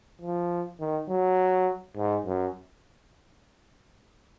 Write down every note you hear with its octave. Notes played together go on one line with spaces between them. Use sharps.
F3
D#3
F#3
G#2
F#2